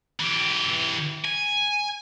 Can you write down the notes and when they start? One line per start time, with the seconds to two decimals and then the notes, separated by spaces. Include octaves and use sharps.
0.20 E3 G4
1.25 G#5